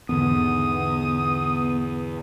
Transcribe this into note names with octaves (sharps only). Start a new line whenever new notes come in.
E2 G#2 D3 B3 D#6